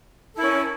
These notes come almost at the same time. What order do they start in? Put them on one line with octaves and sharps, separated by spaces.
A4 E4 A#4 C#4